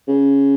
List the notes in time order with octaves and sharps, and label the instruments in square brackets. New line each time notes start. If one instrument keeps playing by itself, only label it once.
[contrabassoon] C#3